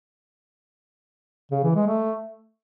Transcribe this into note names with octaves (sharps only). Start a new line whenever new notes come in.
C#3
E3
G#3
A3